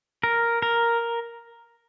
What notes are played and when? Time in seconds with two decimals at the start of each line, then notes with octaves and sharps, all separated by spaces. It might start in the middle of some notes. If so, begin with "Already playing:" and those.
0.23 A#4
0.62 A#4